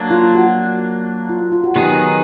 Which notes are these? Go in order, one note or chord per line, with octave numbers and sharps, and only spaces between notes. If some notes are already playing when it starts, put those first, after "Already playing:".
Already playing: F#3 A#3 D4
F4
F#4
F4
F4
F#4
D#3 F#3 B3 D#4 G4 G#4